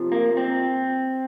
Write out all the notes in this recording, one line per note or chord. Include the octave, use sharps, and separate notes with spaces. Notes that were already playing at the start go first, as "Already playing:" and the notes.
Already playing: C3 F3
A#3
C4